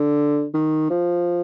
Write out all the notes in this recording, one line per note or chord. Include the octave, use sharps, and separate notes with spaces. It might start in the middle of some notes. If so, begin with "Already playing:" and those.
Already playing: D3
D#3
F3